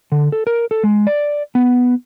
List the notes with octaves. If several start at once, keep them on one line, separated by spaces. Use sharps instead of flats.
D3
A4
A#4
A4
G#3
D5
B3